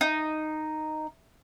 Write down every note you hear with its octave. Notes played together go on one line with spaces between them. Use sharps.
D#4